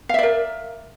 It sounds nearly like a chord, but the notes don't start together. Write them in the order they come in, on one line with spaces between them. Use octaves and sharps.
F5 E5 D5 A#4